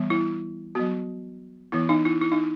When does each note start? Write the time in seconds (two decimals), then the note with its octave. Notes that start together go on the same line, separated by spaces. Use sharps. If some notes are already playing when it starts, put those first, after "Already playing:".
Already playing: E3 G3 B3
0.10 E4
0.75 F#3 B3 F#4
1.72 E3 B3 E4
1.89 D#4
2.05 E4
2.22 E4
2.32 D#4